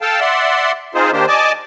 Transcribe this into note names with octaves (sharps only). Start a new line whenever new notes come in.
A4 F5 G5 A5
D5 E5 F#5 C6
C4 D#4 F4 G#4 C5
D#3 A#3 D4 G4 C5
D5 D#5 G#5 A5 D6